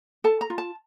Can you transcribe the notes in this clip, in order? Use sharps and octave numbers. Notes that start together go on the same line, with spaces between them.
A4 A5
A#5
F4
A5